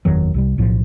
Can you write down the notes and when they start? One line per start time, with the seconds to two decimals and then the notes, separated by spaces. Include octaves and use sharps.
0.05 F#1 E2 D#3 F#3
0.34 C2 C3 G3
0.58 B1 A2 F3